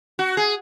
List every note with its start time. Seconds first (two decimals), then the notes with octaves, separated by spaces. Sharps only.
0.19 F#4
0.37 G#4